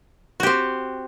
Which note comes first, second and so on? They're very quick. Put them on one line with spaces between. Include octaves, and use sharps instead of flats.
F#4 G4 C4